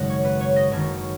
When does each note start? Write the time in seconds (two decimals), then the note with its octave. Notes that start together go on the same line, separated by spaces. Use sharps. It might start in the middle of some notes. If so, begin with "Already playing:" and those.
Already playing: G#1 F#2 C#3 G#3 C#4 D#5 F#5
0.10 C#5
0.25 B4
0.41 C#5
0.56 D#5
0.71 F#1 F#2 D#3 C#5